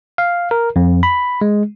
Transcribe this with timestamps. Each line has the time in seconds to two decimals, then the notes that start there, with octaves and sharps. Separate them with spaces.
0.18 F5
0.51 A#4
0.76 F2
1.03 B5
1.41 G#3